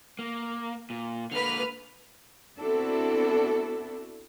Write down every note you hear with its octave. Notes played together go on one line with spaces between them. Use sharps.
A#3
A#2
D3 A#3 B4 F6
B3 C4 D4 E4 F#4 A4